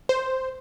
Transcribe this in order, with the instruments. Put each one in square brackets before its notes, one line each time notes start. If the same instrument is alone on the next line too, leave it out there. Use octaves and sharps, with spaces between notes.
[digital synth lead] C5